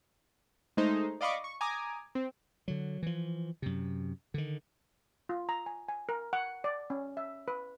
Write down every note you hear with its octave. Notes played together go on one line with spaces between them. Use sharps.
G#3 A3 D#4 C5
D5 D#5 F5 B5 C#6 D6
C#6
G#5 A#5 D6 D#6
C4
D3 F#3
E3 F3
F#2 C3
D3 D#3
F4
A#5
G#5
G#5
A#4
F#5
D5
C#4
E5
B4